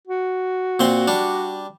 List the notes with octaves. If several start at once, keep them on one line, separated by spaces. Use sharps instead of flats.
F#4
A#2 C4 C6
G3 D4